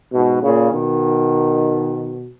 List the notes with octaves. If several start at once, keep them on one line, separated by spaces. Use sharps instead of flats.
G#2 B2
A#2 C#3
B2 D#3